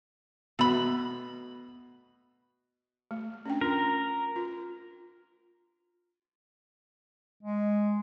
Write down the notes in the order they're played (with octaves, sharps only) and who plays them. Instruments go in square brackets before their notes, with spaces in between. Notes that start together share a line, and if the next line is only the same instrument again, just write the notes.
[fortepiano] B2 [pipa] A3 B5
[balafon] A3
C#4 D4 G5
[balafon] F4 [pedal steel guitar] A#4
[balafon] F4
[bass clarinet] G#3